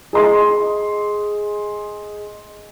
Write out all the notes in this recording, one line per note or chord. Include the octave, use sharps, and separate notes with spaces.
G#4 D#5 C6